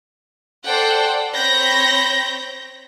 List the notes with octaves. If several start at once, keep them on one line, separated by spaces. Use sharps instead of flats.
A4 C5 D5 F#5 G5
C4 C#5 B5 G6 A#6